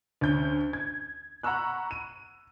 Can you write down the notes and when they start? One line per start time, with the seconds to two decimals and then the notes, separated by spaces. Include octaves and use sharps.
0.21 D2 C#4 G6
0.73 G#6
1.43 F#5 A#5 B5 C#6 E6 F#6
1.91 D#7